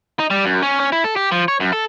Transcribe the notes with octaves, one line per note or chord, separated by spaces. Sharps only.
D#4
G3
F#2
C#4
C#4
E4
A4
G4
F3
C#5
F#2
A4